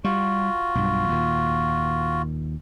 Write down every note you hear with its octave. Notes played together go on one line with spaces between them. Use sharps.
G3 F4 F#4
B1 G2
D#2 A#2